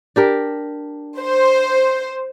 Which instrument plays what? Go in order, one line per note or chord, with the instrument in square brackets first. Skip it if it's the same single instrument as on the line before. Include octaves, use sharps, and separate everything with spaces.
[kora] D4 G4 A#4
[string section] C5